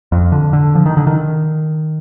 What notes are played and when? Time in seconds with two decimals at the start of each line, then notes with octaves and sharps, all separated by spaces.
0.12 F2
0.32 D3
0.53 D3
0.75 F3
0.86 D#3
0.97 D3
1.07 D#3